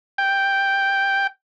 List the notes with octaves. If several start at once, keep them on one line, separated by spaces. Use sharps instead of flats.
G5